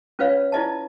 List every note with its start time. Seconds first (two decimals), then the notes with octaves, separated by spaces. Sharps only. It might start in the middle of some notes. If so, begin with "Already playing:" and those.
0.19 C#4 F4 B4 C#5 F5
0.52 E4 F4 D5 D#5 G#5 A5